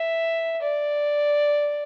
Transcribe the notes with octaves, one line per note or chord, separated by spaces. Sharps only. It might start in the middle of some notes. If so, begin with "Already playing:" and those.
Already playing: E5
D5